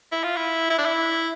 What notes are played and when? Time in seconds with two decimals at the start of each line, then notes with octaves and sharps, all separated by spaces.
0.12 E4
0.23 F4
0.36 E4
0.70 E4
0.78 D4
0.86 E4